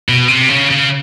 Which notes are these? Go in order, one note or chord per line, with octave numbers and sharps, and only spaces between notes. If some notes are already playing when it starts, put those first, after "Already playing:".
B2
C3
C#3
C#3